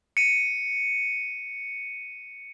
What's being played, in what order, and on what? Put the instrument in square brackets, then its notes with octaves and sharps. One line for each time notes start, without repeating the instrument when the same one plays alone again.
[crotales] C#7 D#7